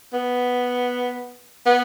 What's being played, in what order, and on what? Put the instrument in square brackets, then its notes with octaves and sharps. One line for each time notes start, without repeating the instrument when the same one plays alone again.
[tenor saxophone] B3
B3